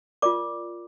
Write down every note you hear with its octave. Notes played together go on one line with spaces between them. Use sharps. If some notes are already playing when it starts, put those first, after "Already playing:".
F4 A#4 D5 D6